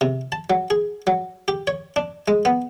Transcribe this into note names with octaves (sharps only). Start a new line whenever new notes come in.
C3
A5
F#3
G#4
F#3
G4
C#5
D4
G#3
B3